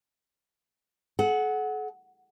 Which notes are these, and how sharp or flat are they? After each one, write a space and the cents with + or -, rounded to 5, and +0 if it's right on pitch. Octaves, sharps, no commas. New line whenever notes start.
A4 -45 F#5 +0